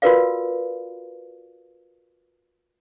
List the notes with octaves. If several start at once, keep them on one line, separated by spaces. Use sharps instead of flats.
F4 F#4 A#4 B4 D5 F5